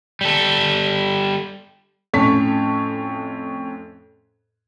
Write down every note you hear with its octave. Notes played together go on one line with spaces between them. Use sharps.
G3 A4
F2 A2 C#4 C#5 A5 B6